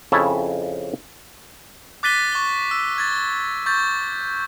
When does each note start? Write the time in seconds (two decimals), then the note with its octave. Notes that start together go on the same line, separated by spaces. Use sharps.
0.12 F2 C#3 E4 C#5 E5 A5
2.03 D6 F#6 A6 B6 D#7 G7
2.32 C#6 G7
2.71 E6
2.98 G#6 A6
3.66 C#6 G6 A6